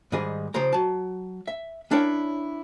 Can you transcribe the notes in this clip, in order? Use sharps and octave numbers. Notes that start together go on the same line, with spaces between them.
G#2 D#3 G3 G#4 D#5
C#3 F3 G4 C5 A#5
F#3 A5
E5
C#4 D4 E4 A#4 C#5 G5